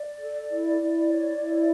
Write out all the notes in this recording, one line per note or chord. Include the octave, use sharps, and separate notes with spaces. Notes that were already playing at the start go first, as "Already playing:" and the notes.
Already playing: D5
A4
E4
E4
C#5
E4